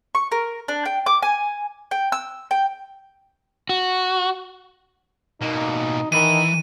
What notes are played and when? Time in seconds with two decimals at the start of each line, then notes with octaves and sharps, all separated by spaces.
0.15 C#6
0.32 A#4
0.68 D4
0.86 G5
1.06 D6
1.23 G#5
1.91 G5
2.12 E6
2.51 G5
3.69 F#4
5.41 B2 A#3 D#4
6.12 D#3 E3 B5 D#7